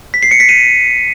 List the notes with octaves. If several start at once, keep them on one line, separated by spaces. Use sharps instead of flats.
B6
C7
C#7
B6
D#7